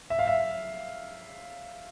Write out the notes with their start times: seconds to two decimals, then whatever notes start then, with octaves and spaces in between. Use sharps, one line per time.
0.10 E5
0.19 F5
0.28 E5